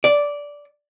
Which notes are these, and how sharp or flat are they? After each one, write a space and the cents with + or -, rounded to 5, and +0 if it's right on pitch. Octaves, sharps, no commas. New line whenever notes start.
D5 -10